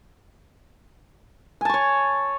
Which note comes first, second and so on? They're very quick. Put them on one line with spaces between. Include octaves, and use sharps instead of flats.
G#5 A5 C#6 C#5